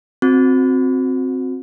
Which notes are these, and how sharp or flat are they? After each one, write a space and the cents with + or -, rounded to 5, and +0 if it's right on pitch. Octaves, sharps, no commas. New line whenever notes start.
C4 +0 F#4 -25